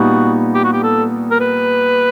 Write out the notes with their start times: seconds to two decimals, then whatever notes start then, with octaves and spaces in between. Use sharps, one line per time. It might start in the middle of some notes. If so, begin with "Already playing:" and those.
Already playing: A#2 G3 B3 D#4 F#4
0.54 G4
0.64 F#4
0.72 G4
0.83 A4
1.31 A#4
1.40 B4